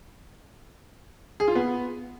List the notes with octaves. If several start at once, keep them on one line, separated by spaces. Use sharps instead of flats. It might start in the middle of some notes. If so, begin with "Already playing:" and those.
G#4
F4
B3